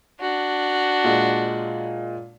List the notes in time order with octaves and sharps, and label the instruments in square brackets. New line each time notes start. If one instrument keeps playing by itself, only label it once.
[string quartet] D4 F#4
[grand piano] A#2 G#3